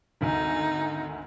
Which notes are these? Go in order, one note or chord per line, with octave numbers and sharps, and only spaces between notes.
G#1 D2 D#4 G#5